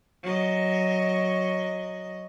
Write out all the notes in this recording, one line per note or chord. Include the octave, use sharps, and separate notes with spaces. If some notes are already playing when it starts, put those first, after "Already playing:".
F#3 D#5